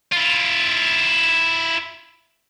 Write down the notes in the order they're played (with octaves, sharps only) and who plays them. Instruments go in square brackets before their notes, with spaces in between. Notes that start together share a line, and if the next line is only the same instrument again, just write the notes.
[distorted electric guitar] E4 F4